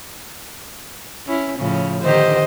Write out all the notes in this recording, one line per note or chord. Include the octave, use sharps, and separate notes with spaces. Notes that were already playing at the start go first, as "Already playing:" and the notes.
C#4 E4
A2 C#3 F3
D3 D#3 G4 C5 D#5